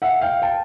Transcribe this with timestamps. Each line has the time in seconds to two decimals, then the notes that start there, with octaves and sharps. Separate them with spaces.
0.02 E5 F#5
0.21 F5 G5
0.42 G5 A5